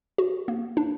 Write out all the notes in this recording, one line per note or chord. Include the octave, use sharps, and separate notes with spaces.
F#4
A#3
D4